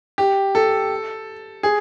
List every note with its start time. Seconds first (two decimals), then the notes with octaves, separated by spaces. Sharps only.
0.18 G4
0.55 A4
1.63 G#4